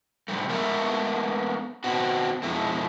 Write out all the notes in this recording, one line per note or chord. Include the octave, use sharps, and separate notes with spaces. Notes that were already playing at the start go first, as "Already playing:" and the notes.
C3 G3 A3
G#3 A3 B3 A#4 B4 E5
B3 C4 F#4
F2 B2 G#3 E4